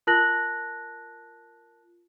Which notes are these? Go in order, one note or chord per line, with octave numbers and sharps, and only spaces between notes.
F4 A#4 A5 F#6 A#6 F#7